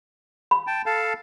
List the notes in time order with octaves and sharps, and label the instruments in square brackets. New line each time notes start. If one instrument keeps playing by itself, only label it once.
[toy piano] B5
[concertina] G5 A5
A4 F5 A5